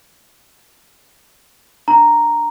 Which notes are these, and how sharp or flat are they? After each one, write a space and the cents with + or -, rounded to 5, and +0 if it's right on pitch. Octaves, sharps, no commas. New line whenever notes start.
D4 +10 A#5 +0